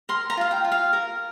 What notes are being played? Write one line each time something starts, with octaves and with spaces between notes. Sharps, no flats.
A#4 C6
A#5
F4 F5
G5
F4
F5
A#4